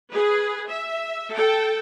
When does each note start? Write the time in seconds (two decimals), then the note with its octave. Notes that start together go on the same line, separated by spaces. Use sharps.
0.12 G#4 B4
0.68 E5
1.33 A4 G5